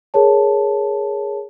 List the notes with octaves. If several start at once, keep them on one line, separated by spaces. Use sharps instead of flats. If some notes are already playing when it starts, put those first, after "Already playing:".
G#4 A#4 C#5 A5